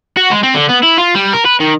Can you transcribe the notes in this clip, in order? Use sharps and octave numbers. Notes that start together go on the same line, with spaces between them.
F#4
G#3
C4
D3
B3
E4
F4
G3
A#4
B4
D#3